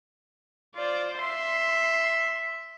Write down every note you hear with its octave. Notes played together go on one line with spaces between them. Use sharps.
F4 C5 D5
E5 C6 C7